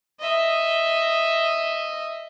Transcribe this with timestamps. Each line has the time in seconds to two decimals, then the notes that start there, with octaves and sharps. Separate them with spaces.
0.20 D#5 E5